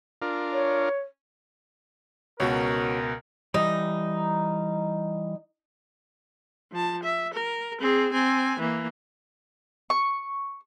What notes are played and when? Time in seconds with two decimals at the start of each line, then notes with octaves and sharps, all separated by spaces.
0.22 D4 F4 A#4
0.53 C#5
2.40 C#2 B2 C#4 F#4 A#4
3.54 E3 G3 D#4
6.72 F3 A5
7.03 E5
7.34 A#4
7.81 C4 G#4
8.13 C4 G#5
8.59 E3 A#3
9.90 C#6